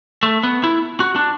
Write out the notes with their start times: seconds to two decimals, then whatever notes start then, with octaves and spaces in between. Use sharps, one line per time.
0.23 A3
0.43 B3
0.64 E4
1.00 F#4
1.16 D4